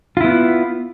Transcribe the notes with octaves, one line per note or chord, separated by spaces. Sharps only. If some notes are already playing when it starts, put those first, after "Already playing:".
B3 E4 F4